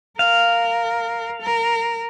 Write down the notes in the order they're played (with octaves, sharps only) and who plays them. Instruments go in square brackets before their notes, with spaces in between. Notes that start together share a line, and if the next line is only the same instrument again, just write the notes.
[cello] A#4 [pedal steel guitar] F5
[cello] A#4